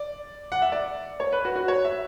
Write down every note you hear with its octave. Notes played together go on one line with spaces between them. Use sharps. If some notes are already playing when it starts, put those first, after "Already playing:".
Already playing: D5
F#5
E5
D5
C#5
B4
F#4
F#4
C#5
E5